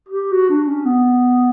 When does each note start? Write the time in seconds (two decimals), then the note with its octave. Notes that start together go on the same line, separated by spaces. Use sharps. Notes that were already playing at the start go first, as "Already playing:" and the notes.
0.09 G4
0.32 F#4
0.50 D4
0.68 C#4
0.85 B3